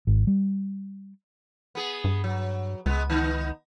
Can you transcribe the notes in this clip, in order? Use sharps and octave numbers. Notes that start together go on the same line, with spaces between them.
G#1
G3
B3 G#4
G2
F#3
C#2 G#3 B3
D#3 B3 D#4